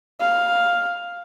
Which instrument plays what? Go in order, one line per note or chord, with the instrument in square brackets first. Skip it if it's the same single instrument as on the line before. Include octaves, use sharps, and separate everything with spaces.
[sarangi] F5